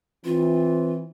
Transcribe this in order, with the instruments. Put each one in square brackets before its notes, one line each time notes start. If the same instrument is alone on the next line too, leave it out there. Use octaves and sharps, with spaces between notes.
[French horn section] E3 C4 [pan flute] F4